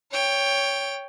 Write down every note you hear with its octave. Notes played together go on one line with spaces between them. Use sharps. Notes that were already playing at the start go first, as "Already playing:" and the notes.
C#5 G5